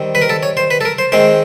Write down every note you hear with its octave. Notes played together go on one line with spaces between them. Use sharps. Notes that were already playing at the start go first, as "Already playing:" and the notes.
Already playing: D#3 G3 C4
B4
A#4
A4
C#5
C5
B4
A4
A#4
C5
D#3 G#3 C4 C5